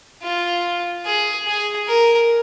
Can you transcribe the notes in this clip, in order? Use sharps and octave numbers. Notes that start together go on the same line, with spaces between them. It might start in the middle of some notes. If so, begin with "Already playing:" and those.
F4
G#4
G#4
A#4